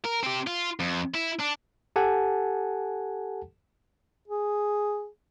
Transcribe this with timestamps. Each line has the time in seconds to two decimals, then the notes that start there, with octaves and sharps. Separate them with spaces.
0.05 A#4
0.23 C4 G4
0.47 F4
0.80 F2
1.14 E4
1.39 D4
1.96 G4 A4 F#5 G#5 A5
4.28 G#4